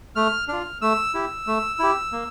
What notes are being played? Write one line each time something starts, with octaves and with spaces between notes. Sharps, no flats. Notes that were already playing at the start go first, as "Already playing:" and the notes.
A3 F6
D4 F4 F6
A3 E6
E4 G4
A3
E4 G4
A#3